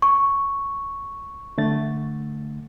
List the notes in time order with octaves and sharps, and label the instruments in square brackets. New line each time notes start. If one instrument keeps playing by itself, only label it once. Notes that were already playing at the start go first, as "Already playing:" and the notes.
[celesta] C#6
[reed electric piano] D3 A3 A6